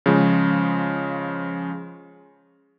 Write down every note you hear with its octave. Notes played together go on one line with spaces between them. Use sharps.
C#3 F3 G#3